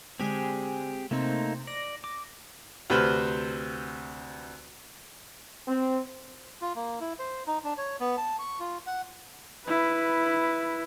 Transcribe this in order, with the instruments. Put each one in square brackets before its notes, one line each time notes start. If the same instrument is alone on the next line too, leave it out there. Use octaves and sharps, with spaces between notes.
[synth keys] D3 G#3 G#5 [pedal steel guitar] C4 G4 G#4
[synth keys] C3 C4 [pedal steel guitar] A3 A#3 D#4
[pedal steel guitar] D5 [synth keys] A#6
[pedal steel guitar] D6
[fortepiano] D2 C3 B4 C5 F6
[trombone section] C4
[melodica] F4
A#3
E4
C5
D#4
D4
C#5
B3
A5
C#6
F4
F#5
[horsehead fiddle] E4 B4